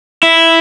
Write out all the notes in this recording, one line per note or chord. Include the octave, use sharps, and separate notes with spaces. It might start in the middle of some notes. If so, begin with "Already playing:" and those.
E4